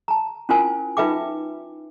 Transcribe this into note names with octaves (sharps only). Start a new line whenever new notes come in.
A5 A#5
C#4 E4 F4 A#4 C5 G#5
D#4 F4 B4 E5 G5 D6